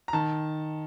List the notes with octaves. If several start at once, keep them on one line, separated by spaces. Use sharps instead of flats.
A#5
D#3 A5